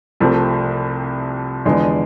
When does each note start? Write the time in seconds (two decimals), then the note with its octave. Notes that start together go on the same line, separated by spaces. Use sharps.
0.20 C2 C3 F3 A3 C4
1.65 E2 D3 F3 G#3 B3